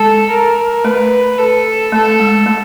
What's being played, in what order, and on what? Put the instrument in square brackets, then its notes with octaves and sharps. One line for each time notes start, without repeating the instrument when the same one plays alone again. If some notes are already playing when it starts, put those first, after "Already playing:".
Already playing: [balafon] G#3 [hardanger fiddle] A4
[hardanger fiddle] A#4
[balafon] A3 [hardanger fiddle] B4
[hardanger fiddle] A4
[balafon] A3 [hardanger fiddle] A4
[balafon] G#3
A3